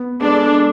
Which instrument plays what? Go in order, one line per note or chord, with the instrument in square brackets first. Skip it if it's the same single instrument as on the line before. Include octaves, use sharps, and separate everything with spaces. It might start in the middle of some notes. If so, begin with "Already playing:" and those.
Already playing: [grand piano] B3
[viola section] G#3 D4 A4 D5 [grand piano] B3